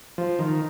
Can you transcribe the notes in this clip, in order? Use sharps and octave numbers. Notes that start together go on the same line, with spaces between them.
F3
D#3